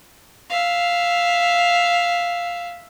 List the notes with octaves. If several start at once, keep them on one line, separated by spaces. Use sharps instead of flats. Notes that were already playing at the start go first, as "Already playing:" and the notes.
E5 F5